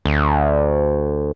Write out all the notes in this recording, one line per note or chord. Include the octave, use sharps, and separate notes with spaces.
D2